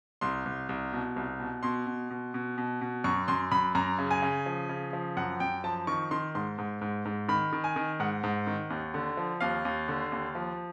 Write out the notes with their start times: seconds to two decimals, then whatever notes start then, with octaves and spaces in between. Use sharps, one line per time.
0.21 C2 C6
0.46 C2
0.69 C2
0.93 B2
1.16 C2
1.40 B2
1.63 B2 C6
1.87 B2
2.10 B2
2.34 B2
2.58 B2
2.81 B2
3.04 F#2 C#6
3.28 F#2 C6
3.52 F#2 B5
3.75 F#2 A#5
3.98 C#3
4.11 G#5
4.22 C#3
4.46 F3
4.69 C#3
4.93 F3
5.17 F#2 F#5
5.40 F#2 G5
5.64 F3 A5
5.87 D#3 C#6
6.11 D#3 C6
6.35 G#2 C6
6.58 G#2
6.81 G#2
7.05 G#2
7.29 D#3 B5
7.53 D#3
7.64 G#5
7.76 D#3
8.00 G#2 F#5
8.24 G#2
8.47 D#3
8.70 D#2
8.94 D3
9.17 F3
9.40 D#2 F5
9.65 D#2
9.88 D3
10.12 D#2
10.35 F3